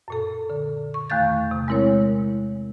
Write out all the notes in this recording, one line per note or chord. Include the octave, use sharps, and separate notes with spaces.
F#2 A#2 A4
D3
C#6
E2 D#3 A3 F5 G6 A6
C3
G#3 C4 E4 A#4 C#5